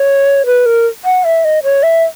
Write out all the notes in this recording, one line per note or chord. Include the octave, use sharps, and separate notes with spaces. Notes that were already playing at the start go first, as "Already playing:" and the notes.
Already playing: C#5
B4
A#4
F#5
E5
D#5
C#5
E5